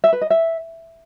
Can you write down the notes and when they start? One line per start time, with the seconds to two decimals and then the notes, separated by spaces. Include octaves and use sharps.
0.04 E5
0.13 B4
0.22 D#5
0.30 E5